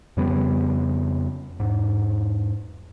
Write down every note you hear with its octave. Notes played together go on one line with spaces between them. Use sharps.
F2 C#3 G3 B3
E2 G#2